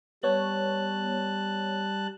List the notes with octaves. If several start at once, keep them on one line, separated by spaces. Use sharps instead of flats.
G3 B3 C#5 A5 F#6